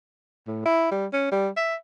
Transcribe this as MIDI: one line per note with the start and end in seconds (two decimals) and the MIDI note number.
0.47 0.65 45
0.65 0.90 64
0.91 1.06 55
1.13 1.29 61
1.32 1.48 55
1.57 1.75 76